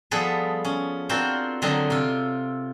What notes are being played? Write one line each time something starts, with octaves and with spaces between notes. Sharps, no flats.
F3 G3 B3 G#4 A4 B4
C#4
C4 D4 F4 F#4 A#4 C5
D3 F#3 C4 D#5 A#5
C3 F4